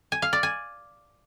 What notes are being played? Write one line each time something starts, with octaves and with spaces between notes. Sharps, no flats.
G#5
F5
D5
G#5